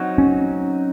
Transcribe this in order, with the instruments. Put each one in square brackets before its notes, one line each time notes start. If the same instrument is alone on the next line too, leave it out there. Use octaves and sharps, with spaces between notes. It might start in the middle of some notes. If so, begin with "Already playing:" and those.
Already playing: [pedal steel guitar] F#3 C4 D#4 F#4
[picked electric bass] C#4